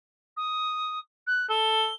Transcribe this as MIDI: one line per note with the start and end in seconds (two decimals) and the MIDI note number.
0.37 0.99 87
1.27 1.49 90
1.50 1.89 69
1.50 1.94 103